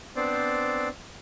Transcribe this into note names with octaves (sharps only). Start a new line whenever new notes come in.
B3 C4 D4 C5 D5